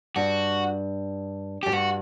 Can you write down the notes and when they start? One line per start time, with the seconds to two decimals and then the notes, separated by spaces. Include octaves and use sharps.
0.16 G2 F#4
1.63 F#2 G4
1.72 G2 F#4